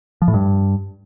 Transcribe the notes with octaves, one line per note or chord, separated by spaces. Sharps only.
F3
A2
G2